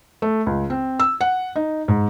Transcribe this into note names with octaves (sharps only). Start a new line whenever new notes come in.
A3
C#2
C4
E6
F#5
D#4
G#2